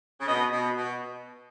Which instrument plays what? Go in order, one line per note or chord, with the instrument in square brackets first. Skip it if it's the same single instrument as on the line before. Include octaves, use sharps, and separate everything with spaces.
[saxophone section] C#3
[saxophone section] B2 [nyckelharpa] D#5
[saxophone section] B2
B2